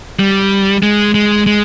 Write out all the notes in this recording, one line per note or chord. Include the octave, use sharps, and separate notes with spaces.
G3
G#3
G#3
G#3